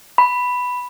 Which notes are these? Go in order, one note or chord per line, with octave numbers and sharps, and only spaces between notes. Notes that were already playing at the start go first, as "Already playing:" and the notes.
B5